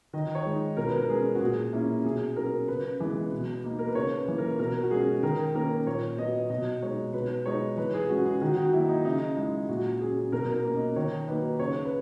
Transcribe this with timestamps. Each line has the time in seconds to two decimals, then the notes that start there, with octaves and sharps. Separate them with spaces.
0.13 D#3 D#5
0.35 C#5
0.45 G#3 D#4
0.77 B2 A#4
0.87 B4
0.97 A#4
1.09 G#3 C#4 G#4
1.35 F#4
1.40 A#2 G#4
1.73 A#3 C#4 E4
2.05 B2 G#4
2.36 F#3 C#4 A#4
2.68 C#3 B4
3.00 E3 G#3 B3
3.32 B2
3.64 A#3 D#4
3.79 A#4
3.88 B4
3.95 C#3 C#5
4.17 B4
4.28 E3 A#3
4.38 A#4
4.59 B2 A#4
4.83 F#4
4.91 G#3 C#4 G#4
5.23 D#3 A#4
5.54 A#3 C#4 A#4
5.87 A#2 C#5
6.18 F#3 B3 D#5
6.50 B2 D#5
6.82 G#3 D#4 C#5
7.13 B2 B4
7.46 G#3 D#4 C#5
7.77 E3 B4
7.94 G#4
8.09 G#3 C#4 F#4
8.25 G#4
8.41 D#3 F#4
8.57 F#4
8.73 F#3 A#3 D#4 E4
8.89 D#4
9.05 C#3 D#4
9.37 G#3 D#4 E4
9.69 A#2 F#4
10.00 F#3 C#4 G#4
10.32 B2 A#4
10.54 A#4
10.64 A#3 C#4
10.75 D#5
10.96 D#3 C#5
11.27 F#3 A#3 D#4 B4
11.59 C#3 C#5
11.85 B4